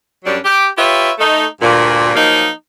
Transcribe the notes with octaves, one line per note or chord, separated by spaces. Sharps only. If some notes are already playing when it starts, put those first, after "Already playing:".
F#2 F#3 G3 C#4 D4
G4
F4 G4 B4 C#5 E5
A3 D#4
D2 G2 A#2
F3 F#3 A#3 D#4